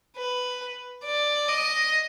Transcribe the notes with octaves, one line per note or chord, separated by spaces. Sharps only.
B4
D5
D#5